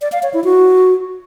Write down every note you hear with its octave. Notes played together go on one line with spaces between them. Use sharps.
D5
F5
C#5
E4
F#4